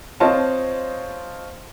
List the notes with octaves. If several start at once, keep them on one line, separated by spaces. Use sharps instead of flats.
C4 F4 C5 C#5 D#5 A5